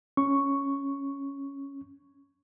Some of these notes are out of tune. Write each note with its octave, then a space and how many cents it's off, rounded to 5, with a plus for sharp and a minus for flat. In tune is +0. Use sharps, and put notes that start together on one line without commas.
C#4 +0 C#6 +0